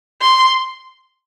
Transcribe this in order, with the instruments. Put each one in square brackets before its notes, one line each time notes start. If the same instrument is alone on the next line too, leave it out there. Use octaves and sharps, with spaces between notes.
[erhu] C6